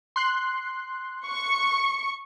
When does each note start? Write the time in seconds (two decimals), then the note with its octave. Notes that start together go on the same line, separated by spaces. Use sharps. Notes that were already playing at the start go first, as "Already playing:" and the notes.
0.16 C6 F#6 C7
1.25 C#6